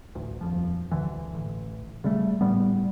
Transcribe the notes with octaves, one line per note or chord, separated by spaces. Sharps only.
A1 D2
D#1 F2 F3
D2 G2 D3 E3
A1
C#3 G3 A3
G#1 A2 G3 B3